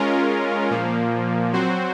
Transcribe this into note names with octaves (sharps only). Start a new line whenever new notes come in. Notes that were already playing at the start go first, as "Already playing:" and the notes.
Already playing: G#3 C#4 F4 A#4
A#2 F3 A#3
F#3 C4 F#4 C5